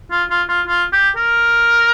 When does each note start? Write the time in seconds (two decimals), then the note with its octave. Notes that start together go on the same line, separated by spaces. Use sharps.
0.11 F4
0.30 F4
0.49 F4
0.67 F4
0.92 G4
1.16 A#4